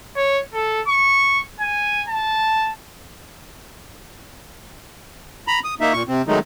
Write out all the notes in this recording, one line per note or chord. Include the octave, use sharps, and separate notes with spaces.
C#5
A4
C#6
G#5
A5
A#5 B5
D#6
A#3 D#4 E5
A#2 C#6
C3 C4
D#3 F#3 G#3 A3 D#4